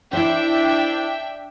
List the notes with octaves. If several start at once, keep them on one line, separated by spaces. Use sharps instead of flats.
D4 E4 C5 E5 G5